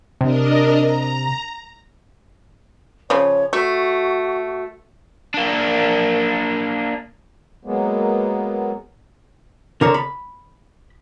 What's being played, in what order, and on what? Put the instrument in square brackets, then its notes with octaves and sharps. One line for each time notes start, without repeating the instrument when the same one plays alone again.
[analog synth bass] C3 [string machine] D4 A#4 D#5
[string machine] A#5
[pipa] C#3 F3 [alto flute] C#5
[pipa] A3 [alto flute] F#4
[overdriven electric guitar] A#3 D4
[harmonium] F#3 G#3 A#3 B3
[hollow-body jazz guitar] D3 A#4 C#5
B5